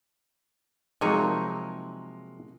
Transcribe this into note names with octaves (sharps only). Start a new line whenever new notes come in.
C3 F3 F#3 G#3 A#3 D#4 A#4 C#5